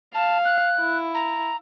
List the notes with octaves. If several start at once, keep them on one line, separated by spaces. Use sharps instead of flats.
F5 A5
F#6
E4
A#5